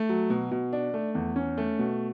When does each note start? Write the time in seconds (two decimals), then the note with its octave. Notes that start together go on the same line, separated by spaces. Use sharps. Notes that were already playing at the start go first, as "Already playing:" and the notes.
Already playing: A3
0.09 F#3
0.30 B2
0.51 B2
0.73 D4
0.94 A3
1.15 E2
1.36 C#4
1.58 A3
1.79 B2